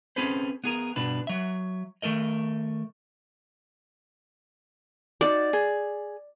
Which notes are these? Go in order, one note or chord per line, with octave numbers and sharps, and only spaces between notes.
C4 C#4 G#4 A4 B4 C5
B3 G#4 A#4
G2 B2 D4 B4
F#3 E5
D#3 A3 A4 A#4 D#5
D#4 F#4 D5
G#4